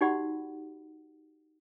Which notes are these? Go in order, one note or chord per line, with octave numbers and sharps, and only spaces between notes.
D#4 F#4 G4 D5 F#5 B5